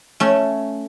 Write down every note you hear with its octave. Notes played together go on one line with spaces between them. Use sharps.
A3 C#4